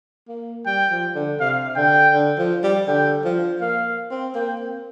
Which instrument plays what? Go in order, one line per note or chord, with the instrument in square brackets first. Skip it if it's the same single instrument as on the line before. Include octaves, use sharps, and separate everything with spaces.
[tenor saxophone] A#3
[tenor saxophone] G3 [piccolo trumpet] G5
[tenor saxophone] F3
D3
[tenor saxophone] C3 [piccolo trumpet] F5
[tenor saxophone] D3 [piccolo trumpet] G5
[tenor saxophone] D3
F3
G3
[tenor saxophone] D3 [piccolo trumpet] G5
[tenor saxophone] F3
[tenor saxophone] A#3 [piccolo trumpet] F5
[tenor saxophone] C4
[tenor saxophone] A#3 [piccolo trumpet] G5
[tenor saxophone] C4